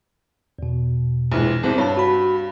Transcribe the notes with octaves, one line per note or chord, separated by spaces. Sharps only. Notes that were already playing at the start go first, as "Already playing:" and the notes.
E2 B2
A#1 E3 G#3
C2 C3
G2 C#5 A5
F#4 B5